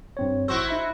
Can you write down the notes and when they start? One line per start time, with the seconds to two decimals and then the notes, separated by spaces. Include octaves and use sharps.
0.17 G2 C4 C#5
0.48 A1 E4 F#4 C5 C#6 E6
0.69 D#4 E5 B5